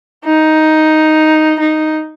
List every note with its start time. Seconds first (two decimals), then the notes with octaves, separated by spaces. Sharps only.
0.25 D#4
1.59 D#4